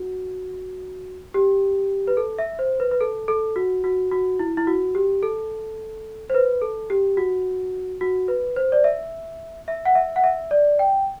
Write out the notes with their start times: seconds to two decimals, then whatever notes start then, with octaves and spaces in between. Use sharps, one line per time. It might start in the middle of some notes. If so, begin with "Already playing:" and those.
Already playing: F#4
1.34 G4
2.07 B4
2.17 A4
2.38 E5
2.59 C5
2.80 B4
2.91 B4
3.01 A4
3.28 A4
3.56 F#4
3.84 F#4
4.11 F#4
4.39 E4
4.57 E4
4.67 F#4
4.95 G4
5.23 A4
6.30 C5
6.34 B4
6.61 A4
6.90 G4
7.17 F#4
8.01 F#4
8.28 B4
8.56 C5
8.72 D5
8.84 E5
9.68 E5
9.85 F#5
9.95 E5
10.16 F#5
10.24 E5
10.51 D5
10.79 G5